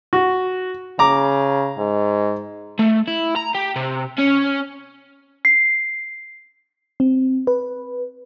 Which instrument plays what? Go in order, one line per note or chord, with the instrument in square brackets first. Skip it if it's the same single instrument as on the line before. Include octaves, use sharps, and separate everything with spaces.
[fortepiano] F#4
[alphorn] C#3 [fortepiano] A#5 D6
[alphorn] G#2
[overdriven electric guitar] A3
E4
A#5
G4
C3
C#4
[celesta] C7
[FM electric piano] C4
B4